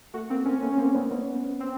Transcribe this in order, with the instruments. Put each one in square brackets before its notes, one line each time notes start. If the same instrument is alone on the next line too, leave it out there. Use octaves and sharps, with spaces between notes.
[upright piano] A3 [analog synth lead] F#4
[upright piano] A#3 [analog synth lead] C4
[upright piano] A#3 C4 [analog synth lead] C#4
[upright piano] A3 B3
A#3 C4
B3 C#4
B3 C#4
[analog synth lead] C4